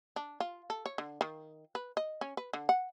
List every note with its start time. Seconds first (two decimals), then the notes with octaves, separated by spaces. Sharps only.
0.16 D4
0.40 F4
0.70 A4
0.86 C#5
0.98 D3
1.21 D#3
1.75 B4
1.97 D#5
2.21 C#4
2.37 B4
2.53 D3
2.69 F#5